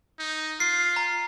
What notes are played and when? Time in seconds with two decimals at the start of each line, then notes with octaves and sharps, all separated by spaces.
0.19 D#4
0.60 F4 C7
0.96 A#5